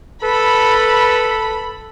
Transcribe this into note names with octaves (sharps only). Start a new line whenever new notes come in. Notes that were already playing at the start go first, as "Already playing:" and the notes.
A4 B4 B5